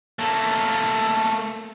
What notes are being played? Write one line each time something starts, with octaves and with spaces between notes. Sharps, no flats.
A3 A#3